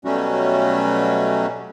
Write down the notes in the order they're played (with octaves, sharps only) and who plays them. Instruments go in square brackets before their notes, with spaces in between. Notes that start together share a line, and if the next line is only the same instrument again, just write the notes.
[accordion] B2 F#3 G3 A3 C#4 F#4